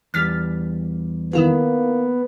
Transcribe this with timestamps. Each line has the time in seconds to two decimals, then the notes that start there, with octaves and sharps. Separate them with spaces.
0.14 E2 G3 F6 A6 B6
1.33 D#3 A#3 B3 E4 F4